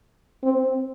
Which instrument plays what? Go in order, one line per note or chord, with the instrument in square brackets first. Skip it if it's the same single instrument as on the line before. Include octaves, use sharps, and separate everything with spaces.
[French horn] C4